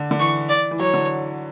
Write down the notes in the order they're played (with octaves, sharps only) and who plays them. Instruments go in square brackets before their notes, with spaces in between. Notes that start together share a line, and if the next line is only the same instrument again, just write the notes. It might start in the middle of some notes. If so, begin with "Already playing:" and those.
Already playing: [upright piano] D3
D3
[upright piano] E3 [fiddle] C#6
[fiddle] D5
[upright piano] E3
[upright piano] F#3 [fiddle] C#5
[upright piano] D3